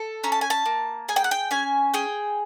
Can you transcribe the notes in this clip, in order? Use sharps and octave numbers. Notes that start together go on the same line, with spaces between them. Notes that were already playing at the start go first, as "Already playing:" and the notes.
Already playing: A4
C#4 A#5
A5
G#5
A5
A#3
G#4 G#5
G5
F#5
G5
C#4 G#5
G#4 G5